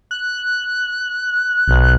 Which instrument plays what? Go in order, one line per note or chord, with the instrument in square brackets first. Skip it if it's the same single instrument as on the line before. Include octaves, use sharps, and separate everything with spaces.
[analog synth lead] F#6
[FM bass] B1